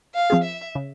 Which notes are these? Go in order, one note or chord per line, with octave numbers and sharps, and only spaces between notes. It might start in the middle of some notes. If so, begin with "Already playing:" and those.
F5
F3 C4 F4 G#4
E5
C#3